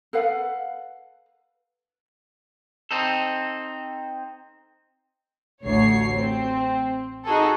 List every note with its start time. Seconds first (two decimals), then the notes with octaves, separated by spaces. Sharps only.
0.13 A4 B4 F5 F#5
2.91 C4 D#4 A4
5.64 A1 D2 C#5 C7
6.17 C4
7.25 D#4 F#4 G#4 A4